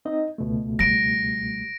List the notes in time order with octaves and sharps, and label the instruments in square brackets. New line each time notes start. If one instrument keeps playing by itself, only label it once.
[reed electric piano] C4 D#4 D#5
C#2 B2 A3
[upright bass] G3 [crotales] A#6 D7